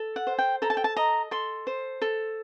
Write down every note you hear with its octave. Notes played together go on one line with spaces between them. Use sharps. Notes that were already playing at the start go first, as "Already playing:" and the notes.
Already playing: A4
F#5
C5
G5
A4 A#5
A5
G5
A5
D#5 A#5
A4 C6
C5
A4